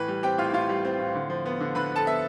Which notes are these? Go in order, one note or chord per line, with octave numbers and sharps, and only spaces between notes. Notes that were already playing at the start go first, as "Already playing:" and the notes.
Already playing: A2 E3 B4
G3
C4 G4 G5
A2 F4 F5
A2 F4 F5
G3
C4
A2
D3
F3
B3
D3
D3 B4 B5
F3 A4 A5
B3 E5